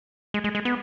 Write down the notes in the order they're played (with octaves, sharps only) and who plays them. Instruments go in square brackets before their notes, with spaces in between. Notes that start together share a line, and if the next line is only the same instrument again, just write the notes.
[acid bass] G#3
G#3
G#3
B3